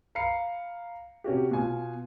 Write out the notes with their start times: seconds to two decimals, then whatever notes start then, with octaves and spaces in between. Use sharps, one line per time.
0.15 F5 A#5 B5 C7 C#7
1.24 C3 C#4 F#4 G4
1.51 B2 F4 G#5